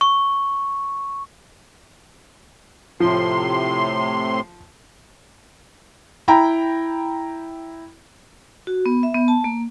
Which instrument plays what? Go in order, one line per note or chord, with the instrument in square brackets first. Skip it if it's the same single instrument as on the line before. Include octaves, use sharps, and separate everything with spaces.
[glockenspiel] C#6
[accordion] A2 C3 C6 [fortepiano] F3
[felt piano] E4 G5 A#5 B5
[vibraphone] F#4
B3
E5
B3
A5
A#3